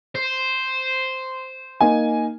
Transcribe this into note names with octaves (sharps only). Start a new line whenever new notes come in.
C5
A#3 D#4 G#5